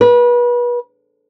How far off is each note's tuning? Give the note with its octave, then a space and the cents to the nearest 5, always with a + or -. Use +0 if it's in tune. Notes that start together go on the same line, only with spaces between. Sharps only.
B4 -30